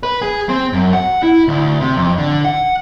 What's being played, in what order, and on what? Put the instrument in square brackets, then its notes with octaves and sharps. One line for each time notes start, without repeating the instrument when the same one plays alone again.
[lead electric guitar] B4
G#4
C4
F#2
F#5
E4
D2
C3
F2
D3
F#5